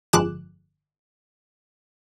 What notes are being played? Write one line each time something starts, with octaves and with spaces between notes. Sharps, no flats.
G1 F2 G#3 D6 F#6 E7